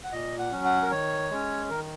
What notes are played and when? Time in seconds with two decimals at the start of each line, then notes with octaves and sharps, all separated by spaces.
0.04 F#5
0.12 A#2 D#5
0.39 F#5
0.52 F#3 C#4
0.65 F#5
0.83 A#4
0.91 D#3 C#5
1.30 G#3 C#4
1.70 D#3 A#4